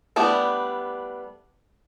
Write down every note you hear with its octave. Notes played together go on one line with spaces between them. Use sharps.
G3 A3 B3 D4 E4